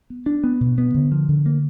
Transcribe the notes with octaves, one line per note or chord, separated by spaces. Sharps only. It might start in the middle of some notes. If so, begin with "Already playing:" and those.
B3
D4
B3
B2
B3
D3
F3
D3
A#3